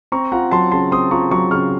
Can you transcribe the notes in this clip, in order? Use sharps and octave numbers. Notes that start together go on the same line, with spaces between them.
C4 A#5 C#6
F4 F#5 A#5
F#3 A5 C6
C#3 A5 C6
C4 C6 D#6
F4 A#5 C#6
F#3 A#5 C#6
C#3 C#6 F6